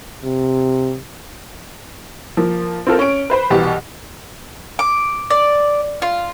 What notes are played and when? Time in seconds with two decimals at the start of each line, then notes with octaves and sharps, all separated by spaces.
0.24 C3
2.37 F3 A#3
2.87 C4 F4 A4 A#4
2.99 C#4 D7
3.30 B4 C5 B5
3.50 C2 B2 E3 G4
4.79 D6
5.30 D5
6.02 F4